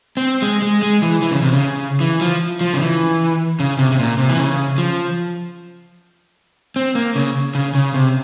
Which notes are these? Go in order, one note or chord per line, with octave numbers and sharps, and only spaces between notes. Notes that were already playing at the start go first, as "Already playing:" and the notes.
C4
G#3
G#3
G#3
E3
E3
C#3
C3
C#3
E3
F3
F3
C#3
E3
C#3
C3
C3
A#2
C3
E3
C#3
F3
C4
A#3
C#3
C#3
C#3
C3